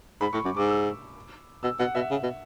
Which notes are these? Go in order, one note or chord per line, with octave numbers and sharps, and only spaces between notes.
G#2 B5
A2 C#6
F#2 D6
G#2 D6
E6
B2 E6
B2 F#5
B2 E5
C#3
B2